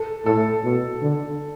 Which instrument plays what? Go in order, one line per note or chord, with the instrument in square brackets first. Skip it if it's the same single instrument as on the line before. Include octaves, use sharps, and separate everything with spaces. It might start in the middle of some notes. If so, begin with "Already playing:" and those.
Already playing: [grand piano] A4
[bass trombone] A2 [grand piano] A4
[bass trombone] B2
D3